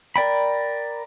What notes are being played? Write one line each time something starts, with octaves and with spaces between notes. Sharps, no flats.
A#4 D5 G5 B5